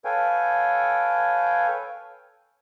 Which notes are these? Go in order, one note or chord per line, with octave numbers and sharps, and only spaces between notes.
A4 B4 C#5 F5 G5 G#5